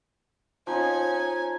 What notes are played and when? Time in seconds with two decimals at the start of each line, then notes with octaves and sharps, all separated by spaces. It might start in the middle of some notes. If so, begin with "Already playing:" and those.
0.67 F3 C#4 D#4 G#5